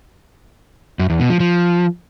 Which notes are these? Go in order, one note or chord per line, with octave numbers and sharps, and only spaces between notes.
F#2
E2
B2
F3
F3